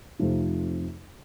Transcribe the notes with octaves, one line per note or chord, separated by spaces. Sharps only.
F2 C3 F3 A3 D#4